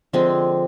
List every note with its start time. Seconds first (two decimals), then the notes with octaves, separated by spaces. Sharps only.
0.13 D3 F3 G#3 C4